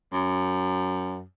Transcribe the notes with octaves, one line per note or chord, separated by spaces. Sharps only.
F#2